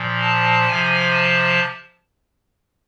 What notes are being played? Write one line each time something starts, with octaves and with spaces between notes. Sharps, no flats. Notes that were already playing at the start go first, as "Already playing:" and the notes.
Already playing: A#2 F3
A5
C3 F3 G#5
A5